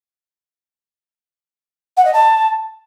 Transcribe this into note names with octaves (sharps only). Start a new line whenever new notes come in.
F#5
D#5
A5